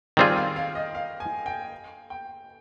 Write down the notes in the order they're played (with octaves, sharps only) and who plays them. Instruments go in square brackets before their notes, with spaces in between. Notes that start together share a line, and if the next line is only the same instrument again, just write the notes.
[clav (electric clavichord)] D#3 G3 C4 F4 G#4 [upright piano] G5
[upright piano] F5
F5
D#5
F5
G#5
G5
G5